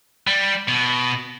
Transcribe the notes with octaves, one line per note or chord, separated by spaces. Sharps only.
G3
B2